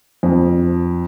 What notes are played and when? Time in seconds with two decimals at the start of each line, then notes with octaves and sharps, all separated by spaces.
0.23 F2